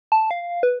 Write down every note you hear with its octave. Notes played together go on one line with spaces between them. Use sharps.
A5
F5
B4